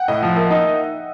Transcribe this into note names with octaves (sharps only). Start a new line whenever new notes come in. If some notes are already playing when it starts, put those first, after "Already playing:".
Already playing: F#5 G5
A2 D#5
F3
A#3 E5
D#4